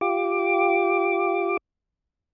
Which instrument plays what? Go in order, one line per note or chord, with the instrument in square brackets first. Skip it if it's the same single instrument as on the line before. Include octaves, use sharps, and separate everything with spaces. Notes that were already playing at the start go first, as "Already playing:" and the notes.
[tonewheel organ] F4 G4 D6